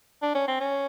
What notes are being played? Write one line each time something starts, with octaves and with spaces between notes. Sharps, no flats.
D4
C#4
C4
C#4